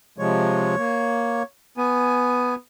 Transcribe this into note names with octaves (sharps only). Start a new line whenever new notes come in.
C3 F3 G#3 C#5
A#3
B3 G#5